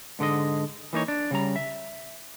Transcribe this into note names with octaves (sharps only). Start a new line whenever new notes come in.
G#2 D3 G#3 D#5
E3 A#3 D#4 C#5
D4
C#3 G3 A#5
E5